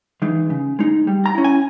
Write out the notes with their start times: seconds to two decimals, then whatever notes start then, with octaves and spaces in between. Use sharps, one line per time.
0.22 E3 G#3 D#4
0.50 C#3
0.79 G#3 D#4
1.07 G3
1.26 A#5
1.35 C#4 E4
1.44 G#5